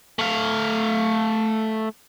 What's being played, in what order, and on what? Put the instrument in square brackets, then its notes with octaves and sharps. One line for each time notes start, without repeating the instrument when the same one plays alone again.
[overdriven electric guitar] A3 F5